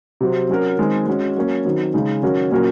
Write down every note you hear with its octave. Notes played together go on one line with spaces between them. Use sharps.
C3 F#3 C4
F#3 C#4 F#4 A#4
D#3 G#3 C4
G#3 C#4 F#4
F#3 A#3 C#4
D#3 F#3 C4
C#3 G#3 D#4 G#4
D#3 F#3 C#4 F#4 A#4
A#2 F#3 C#4 F#4 A#4